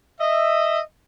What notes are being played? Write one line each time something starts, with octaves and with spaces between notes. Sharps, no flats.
D#5 E5